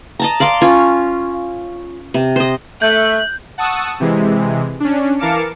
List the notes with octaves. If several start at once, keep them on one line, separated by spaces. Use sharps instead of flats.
D#5 A5 A#5
D5 F5 C6 D6
C#4 F4
C3
C5 D#5
A3 E5 F#6 G6
F#5 A5 C#6 D#6 E6
C3 E3 G#3
C#4 D4
E3 A#4 F5 A5 D6 C#7